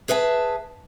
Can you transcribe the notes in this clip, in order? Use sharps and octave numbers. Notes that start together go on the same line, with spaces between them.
G#4 B4 E5 F#5 A5